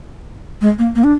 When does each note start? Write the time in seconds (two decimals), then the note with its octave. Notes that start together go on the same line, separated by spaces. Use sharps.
0.61 G#3
0.79 A#3
0.95 A#3
1.04 D4